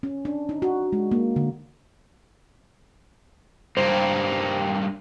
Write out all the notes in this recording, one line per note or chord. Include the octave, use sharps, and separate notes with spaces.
C#4
D4
D#4
F#4
G#3
A#3
D3
G2 A#3 C5